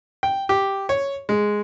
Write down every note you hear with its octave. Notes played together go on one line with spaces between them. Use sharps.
G5
G4
C#5
G#3